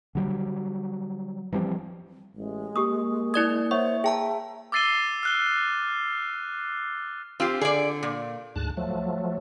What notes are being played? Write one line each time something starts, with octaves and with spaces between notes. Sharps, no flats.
D3 F#3 G3
E3 F3 G3 C4
A1 G#3
A#3 G4 C#6 D#6
E4 D5 D#6 G#6
C5 C#5 E5 F#5 C#6
G#4 E5 G5 A5 A#5
D6 E6 A6 C7 D#7 G7
F6 F#6 G7
C4 F4 G4
D3 G#4 D5
A#2
D2 G#2 A5 F#6
F3 F#3 A3